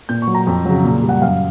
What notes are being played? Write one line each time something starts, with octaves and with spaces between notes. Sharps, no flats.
A#2 G6
C#6
F#3
A#5
F2
C#3 F#3
A#2
G3
F#5
F#2 F5